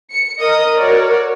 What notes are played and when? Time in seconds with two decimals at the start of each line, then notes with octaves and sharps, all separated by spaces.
0.10 C#7
0.40 A#4 D#5 D#6
0.77 F#4 C#5 D5